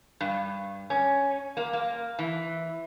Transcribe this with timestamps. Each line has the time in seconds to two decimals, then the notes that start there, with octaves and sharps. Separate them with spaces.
0.21 G2
0.90 C#4
1.57 A#3
1.73 A#3
2.19 E3